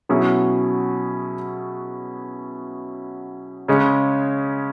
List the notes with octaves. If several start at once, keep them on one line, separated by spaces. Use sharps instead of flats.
B2 F#3 C#4 E4 G#4
C#3 G#3 C#4